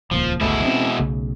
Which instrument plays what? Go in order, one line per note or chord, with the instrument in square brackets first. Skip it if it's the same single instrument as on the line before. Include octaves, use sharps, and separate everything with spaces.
[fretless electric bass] D#1 C#2 A#3 [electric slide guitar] F3
[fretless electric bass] G1 C#2 A3 [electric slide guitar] B2 G#3 E4
[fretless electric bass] C4 C#4
B1 C#3 A3